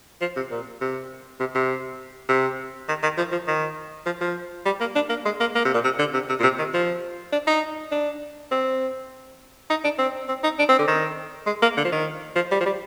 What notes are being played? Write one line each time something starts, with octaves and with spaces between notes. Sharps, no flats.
F3
C3
A#2
C3
C3
C3
C3
D#3
D#3
F3
F3
D#3
F3
F3
G3
A#3
D4
A#3
G#3
A#3
A#3
C3
A#2
C3
D3
C3
C3
A#2
C3
D#3
F3
D4
D#4
D4
C4
D#4
D4
C4
C4
D#4
D4
C4
D3
D#3
G#3
A#3
D3
F3
D#3
F3
G3
F3
G3